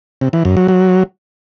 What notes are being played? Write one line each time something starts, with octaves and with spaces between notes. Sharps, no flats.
C3
E3
F#2
F#3
F#3